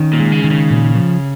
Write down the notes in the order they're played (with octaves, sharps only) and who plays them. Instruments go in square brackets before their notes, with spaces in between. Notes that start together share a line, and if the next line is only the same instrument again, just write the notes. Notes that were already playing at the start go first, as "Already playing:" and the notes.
Already playing: [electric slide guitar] D#3 C#4
[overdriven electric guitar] A#2
[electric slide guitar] G#3
[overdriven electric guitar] C#3
[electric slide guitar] D#3
[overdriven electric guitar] C#3
[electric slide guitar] A#2
F3